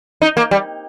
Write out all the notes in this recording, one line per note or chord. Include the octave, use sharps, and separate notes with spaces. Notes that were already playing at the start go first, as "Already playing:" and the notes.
D#4
A#3
G3